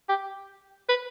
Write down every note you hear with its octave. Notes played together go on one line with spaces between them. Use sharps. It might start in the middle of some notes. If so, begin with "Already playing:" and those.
G4
B4